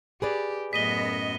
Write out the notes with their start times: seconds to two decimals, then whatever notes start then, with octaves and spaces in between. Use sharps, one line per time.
0.22 G4 G#4 B4 D5
0.73 F#2 A2 B3 D#5 B6 D#7 G7